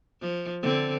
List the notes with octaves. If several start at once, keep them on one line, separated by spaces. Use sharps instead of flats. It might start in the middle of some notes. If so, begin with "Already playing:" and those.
F3
D3 C4